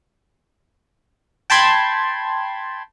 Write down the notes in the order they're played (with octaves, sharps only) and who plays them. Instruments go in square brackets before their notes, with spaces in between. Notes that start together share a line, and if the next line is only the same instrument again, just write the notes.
[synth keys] G5 A5 B5 C6 G#6